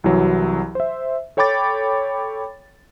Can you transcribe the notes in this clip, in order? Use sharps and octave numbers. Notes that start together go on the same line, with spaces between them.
C2 E3 F#3 F#4
C5 E5
A4 C#5 G5 B5 D6 A6